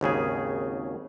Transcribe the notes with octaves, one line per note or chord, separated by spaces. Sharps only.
G#1 D#2 C#3 G#4